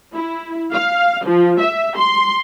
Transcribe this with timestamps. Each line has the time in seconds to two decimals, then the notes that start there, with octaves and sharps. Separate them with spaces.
0.14 E4
0.73 F5
1.25 F3
1.60 E5
1.96 C6